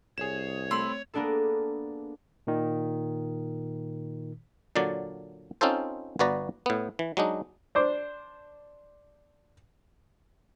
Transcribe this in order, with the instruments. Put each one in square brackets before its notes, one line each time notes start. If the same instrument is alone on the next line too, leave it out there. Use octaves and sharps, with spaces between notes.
[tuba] C2 [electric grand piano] G#4 E7 [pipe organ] C#5
[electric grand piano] A3 C4 [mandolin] B5 C6 E6
[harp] A#3 B3 D4 G#4 A4
[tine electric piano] A#2 D#3
[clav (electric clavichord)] A#2 D3 F#3 D5
C4 C#4 D#4 F4 A4 C5
G1 B3 F#4 B4 D5 A#5
A2 B3
E3
F#3 G#3 D4 D#4
[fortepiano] D4 C5 D6